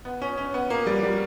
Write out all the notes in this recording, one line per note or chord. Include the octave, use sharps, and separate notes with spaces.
B3
C#4
C#4
B3
A#3
G3
G3